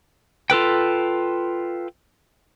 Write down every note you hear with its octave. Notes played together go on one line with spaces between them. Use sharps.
F4 A4 B4 G5